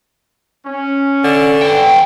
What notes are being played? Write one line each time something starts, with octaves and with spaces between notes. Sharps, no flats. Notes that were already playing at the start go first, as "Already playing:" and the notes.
C#4
D3
B3 G5